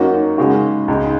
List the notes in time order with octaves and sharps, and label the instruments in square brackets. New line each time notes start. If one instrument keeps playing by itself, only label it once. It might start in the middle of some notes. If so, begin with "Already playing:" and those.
Already playing: [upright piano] F#2 F#3 A#3 D#4 F#4
C#3 G#3 D#4 F#4
C#2 C#3 G#3 D#4